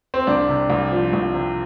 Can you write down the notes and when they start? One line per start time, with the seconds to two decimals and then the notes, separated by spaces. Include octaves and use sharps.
0.14 C4
0.27 C2 D4
0.49 C3
0.70 C2
0.92 F3
1.13 C2
1.34 C3